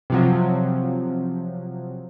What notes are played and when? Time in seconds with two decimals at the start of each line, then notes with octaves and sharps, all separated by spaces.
0.10 C3 F3 F#3